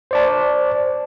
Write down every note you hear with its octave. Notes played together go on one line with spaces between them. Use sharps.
C5 D5 A5